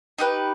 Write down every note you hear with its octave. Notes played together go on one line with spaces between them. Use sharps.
D#4 G4 B4